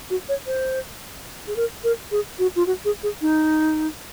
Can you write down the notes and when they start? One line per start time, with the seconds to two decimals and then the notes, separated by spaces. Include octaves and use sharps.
0.10 F#4
0.29 C#5
0.46 C5
1.47 G#4
1.56 A#4
1.84 A#4
2.11 G#4
2.39 F#4
2.56 F4
2.66 F#4
2.85 G#4
3.03 G#4
3.21 D#4